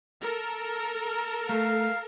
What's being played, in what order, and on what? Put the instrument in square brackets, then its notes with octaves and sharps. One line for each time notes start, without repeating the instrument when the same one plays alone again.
[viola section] A4 A#4
[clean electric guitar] A3 [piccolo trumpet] F5